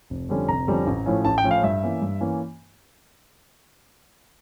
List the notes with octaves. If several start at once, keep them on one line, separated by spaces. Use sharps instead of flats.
F1
F2 D3 G3 C#4
F1 A#5
F2 D3 G3 C#4
A1
A2 F3 C#4 E4
A1 A5
G5
A2 F3 C#4 E4
F5
G2 E5
E3 A#3 C#4
G2
E3 A#3 C#4